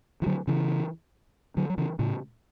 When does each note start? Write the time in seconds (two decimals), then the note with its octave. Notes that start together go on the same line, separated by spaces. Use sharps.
0.22 E3
0.26 D3 F#3
0.47 C#3 E3
1.57 D3 F#3
1.70 F#3
1.77 C#3 E3
1.99 A2 C#3